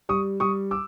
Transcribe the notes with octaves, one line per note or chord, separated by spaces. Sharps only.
G3 C#6 D#6
G3 C#6 D#6
D6 E6